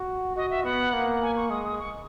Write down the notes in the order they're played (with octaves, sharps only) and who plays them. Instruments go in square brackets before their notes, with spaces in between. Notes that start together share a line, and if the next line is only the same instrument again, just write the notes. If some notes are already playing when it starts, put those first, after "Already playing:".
Already playing: [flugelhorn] F#4
[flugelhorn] F#4 [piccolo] D#5
[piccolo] E5
[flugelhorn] B3 [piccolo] F#5
[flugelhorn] A#3
[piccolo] G#5
C#6
[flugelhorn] G#3 [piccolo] D#6
[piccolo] D#6
C#6